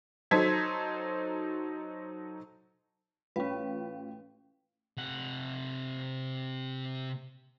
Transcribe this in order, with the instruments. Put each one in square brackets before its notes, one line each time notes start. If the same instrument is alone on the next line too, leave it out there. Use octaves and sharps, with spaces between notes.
[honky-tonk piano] F#3 D#4 A4 C5 G#6 B6
[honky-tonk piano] A1 F4 G5 [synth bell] C#4 B4
[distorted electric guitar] C3 F#5